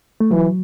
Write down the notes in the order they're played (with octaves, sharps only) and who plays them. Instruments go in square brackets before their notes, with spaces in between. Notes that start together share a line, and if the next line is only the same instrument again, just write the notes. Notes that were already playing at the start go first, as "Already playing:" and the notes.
[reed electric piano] A3
[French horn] E3 [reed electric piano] F#3